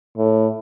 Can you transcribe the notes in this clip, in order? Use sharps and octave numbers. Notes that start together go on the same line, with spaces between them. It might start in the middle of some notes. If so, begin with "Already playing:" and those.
A2